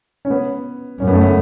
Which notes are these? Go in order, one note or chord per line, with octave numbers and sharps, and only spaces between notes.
C#4
B3
F#2 C#4
B3
A3
B3